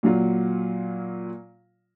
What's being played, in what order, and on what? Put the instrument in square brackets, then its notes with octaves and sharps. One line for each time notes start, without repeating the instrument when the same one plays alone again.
[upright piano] A#2 F#3 F4